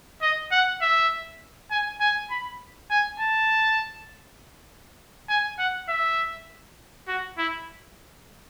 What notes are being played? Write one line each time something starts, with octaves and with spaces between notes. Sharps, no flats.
D#5
F#5
E5
G#5
G#5
B5
G#5
A5
G#5
F#5
E5
F#4
E4